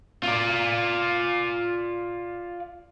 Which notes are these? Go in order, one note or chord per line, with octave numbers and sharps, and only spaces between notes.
F4 D5